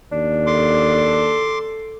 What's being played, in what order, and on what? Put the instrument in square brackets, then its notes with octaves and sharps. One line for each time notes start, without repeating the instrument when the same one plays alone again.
[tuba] D#2 [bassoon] D4
[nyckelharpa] A4 [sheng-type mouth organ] C6 D6